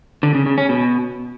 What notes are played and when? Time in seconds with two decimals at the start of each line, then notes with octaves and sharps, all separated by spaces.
0.23 D3
0.35 C#3
0.46 C#3
0.58 C#4
0.69 B2